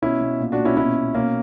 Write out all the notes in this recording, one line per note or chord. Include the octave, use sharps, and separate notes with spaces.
B2 C#4 E4
B2
A#2
D4 F#4
A#2
C#4 E4
B2 C#4 E4
B2
B2 A#3 C#4